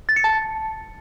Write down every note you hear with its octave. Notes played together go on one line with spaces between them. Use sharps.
A6
C#7
A5